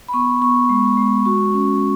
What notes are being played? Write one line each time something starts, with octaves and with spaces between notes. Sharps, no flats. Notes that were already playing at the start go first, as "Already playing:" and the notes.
B5
B3 C#6
B3 C#6
G#3
G#3
F#4 C#6
C#4